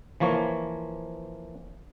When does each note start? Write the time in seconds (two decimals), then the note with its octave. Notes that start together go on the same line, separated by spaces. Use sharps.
0.20 E3 F3 A#3 C#5